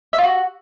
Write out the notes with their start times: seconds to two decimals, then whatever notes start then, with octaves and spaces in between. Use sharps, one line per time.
0.13 E5
0.18 F4
0.24 F#4